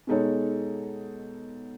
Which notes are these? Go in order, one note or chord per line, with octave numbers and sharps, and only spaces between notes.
B2 G#3 D#4 A4 C#5